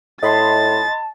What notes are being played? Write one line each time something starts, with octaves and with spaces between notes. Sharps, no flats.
A2 D#5 A5 B5 C6 A6